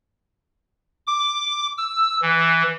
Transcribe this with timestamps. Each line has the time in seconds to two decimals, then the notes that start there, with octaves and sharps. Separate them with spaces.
1.07 D6
1.78 E6
2.22 E3